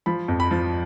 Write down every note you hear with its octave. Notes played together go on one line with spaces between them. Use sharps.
F3 B5
F2
B5
F3